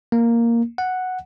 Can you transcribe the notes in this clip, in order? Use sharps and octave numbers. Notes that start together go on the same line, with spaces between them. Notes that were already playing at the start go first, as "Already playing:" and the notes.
A#3
F#5